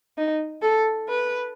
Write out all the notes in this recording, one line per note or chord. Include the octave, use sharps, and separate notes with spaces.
D#4
A4
B4